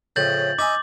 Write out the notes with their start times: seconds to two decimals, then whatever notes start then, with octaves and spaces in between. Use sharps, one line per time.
0.16 F2 A2 C#3 G6 A6 F#7
0.59 D#4 E5 G#5 D6